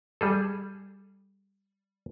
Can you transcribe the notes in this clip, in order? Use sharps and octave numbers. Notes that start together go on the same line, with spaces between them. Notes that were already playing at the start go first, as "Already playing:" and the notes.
G3 G#4 A4